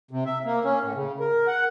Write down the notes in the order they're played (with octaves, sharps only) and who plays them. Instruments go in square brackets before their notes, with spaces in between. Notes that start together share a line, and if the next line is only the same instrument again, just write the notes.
[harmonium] C3
E5
A#3
C#4
A2
C#3
A#4
F#5